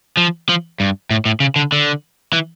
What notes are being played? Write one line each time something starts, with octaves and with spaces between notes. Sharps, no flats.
F3
F3
G2
A2
A2
C#3
D3
D3
E3